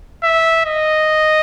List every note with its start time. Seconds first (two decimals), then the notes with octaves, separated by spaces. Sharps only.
0.23 E5
0.66 D#5